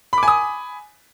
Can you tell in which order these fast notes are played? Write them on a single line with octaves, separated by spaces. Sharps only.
B5 D6 G#5 D#6